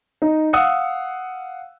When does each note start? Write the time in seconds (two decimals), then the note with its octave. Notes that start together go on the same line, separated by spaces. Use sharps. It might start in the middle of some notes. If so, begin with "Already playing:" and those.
0.22 D#4
0.53 F5 F#5 D#6 E6 F#6 C#7